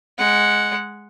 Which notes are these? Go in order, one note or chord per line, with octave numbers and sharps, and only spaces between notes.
G#3 F#5